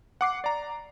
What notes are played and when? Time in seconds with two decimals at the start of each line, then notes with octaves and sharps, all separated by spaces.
0.21 F#5 D6 C7
0.44 D5 A#5